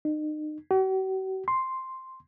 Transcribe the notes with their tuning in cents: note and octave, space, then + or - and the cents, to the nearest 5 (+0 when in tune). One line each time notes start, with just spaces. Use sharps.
D#4 -35
F#4 +45
C6 +0